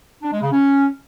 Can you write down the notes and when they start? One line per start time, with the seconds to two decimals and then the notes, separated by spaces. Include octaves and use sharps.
0.23 D4
0.32 G#3
0.42 C#3
0.52 C#4